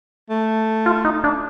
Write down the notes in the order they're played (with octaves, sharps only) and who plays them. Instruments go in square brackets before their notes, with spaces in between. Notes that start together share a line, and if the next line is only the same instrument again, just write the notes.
[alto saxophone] A3
[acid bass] F4
D#4
D4